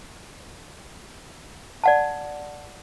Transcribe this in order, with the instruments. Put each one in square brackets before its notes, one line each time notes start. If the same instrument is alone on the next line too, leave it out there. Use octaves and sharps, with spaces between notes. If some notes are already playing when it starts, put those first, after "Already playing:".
[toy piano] D5 F#5 A5